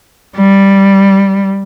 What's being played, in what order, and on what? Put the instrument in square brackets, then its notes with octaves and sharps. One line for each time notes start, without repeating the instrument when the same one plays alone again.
[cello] G3